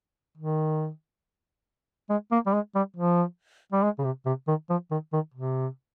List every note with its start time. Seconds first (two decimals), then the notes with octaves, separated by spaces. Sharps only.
0.37 D#3
2.10 G#3
2.31 A#3
2.46 G3
2.53 G#3
2.75 G3
2.96 F3
3.72 G3
3.83 G#3
3.99 C#3
4.04 C3
4.26 C3
4.48 D#3
4.69 F3
4.91 D#3
5.13 D#3
5.34 C3